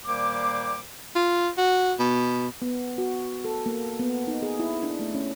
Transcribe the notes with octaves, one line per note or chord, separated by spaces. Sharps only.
A#2 D#3 G3 A#3 C5 D6
F4
F#4
B2
B3
F#4
A4
A#3
B3
D#4
G#4
E4
D4
A3
C#4